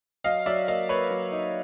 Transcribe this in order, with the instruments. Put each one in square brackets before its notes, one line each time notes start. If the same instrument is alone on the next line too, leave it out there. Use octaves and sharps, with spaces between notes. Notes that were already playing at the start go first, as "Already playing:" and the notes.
[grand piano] F#3 D#5 F5
F#3 D5 E5
A#3 D#5 F5
A#3 B4 C#5
F#3
D#4